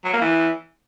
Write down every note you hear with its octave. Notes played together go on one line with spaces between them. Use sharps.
F#3
A#3
E3